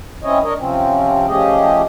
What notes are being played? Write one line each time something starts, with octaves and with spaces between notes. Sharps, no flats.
C4 C#4 E4 C#5 D#5
D4 A#4 C#5 D#5
C3 F3 C4 C#4
F3 A3 C#4 G4 G#4 D#5